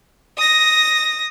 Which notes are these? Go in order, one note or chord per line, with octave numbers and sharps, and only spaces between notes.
D#6 A#6